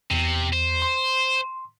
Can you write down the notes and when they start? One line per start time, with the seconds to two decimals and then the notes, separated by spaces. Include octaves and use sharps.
0.11 E2 C3
0.53 C5
0.82 C6